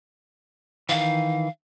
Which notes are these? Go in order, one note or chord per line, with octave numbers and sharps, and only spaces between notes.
D#3 E3 F5